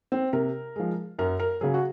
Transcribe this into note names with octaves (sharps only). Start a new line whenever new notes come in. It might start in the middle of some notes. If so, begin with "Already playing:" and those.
C4
C3 A#4
F3 G#3
F#2 A#4
A#4
C#3 F#3 G#4
F#4